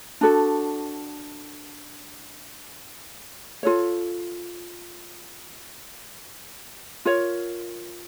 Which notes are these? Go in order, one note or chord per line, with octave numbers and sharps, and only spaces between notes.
D4 F#4 A4
F4 A4 C#5
F4 A#4 C#5